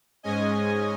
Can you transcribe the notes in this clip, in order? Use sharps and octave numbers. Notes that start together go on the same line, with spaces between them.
G#2 G#3 C#4 D#5 G#5